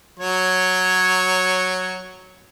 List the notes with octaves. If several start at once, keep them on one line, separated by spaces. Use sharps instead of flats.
F#3 C#5